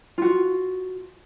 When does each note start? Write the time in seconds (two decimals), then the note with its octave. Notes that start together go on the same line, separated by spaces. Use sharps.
0.18 F4 F#4